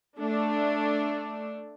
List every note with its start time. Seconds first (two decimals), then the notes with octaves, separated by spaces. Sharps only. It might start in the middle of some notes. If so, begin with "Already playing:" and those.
0.19 A3 D4